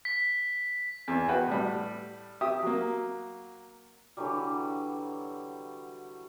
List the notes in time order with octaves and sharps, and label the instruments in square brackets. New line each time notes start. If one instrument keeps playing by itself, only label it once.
[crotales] B6
[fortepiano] E2
F#4 B4 G5
A2 G3
G4 E5 D#6
F#3 A#3
[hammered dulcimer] D3 E3 F#3 G3